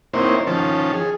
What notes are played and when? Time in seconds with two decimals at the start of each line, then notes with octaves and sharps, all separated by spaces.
0.14 A#3 C4 D#4 E4 C5 C#5
0.47 D#3 F3 C#4 A5
0.93 G#4